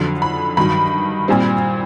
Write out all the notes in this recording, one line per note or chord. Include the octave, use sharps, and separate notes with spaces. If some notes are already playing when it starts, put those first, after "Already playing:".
Already playing: F2 D3 F#3
B5
G2 D#3 F#3 B5
A#2 G3 C4